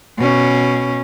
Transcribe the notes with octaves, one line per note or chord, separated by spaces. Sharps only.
B2 C#4